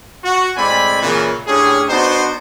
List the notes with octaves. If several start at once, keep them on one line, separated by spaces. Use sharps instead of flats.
F#4
A2 G#3 C4 D5 G#5 B5
A#2 C#3 E3
A2 C#4 D4 G4 G#4
B3 D4 D#4 F#4 C5